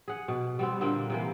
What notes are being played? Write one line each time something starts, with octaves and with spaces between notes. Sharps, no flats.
G#4 F#5
B2
G3 B3 C4
A#2 D3 A#3 C4
C3 E3 A#3